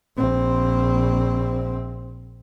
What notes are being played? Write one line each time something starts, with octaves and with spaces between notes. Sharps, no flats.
A#1 C4